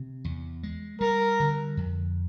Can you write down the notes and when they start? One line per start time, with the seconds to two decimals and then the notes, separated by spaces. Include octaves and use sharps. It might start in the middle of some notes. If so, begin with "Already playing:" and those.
Already playing: C3
0.25 E2
0.63 G#3
1.01 G3 A#4
1.40 D3
1.77 F2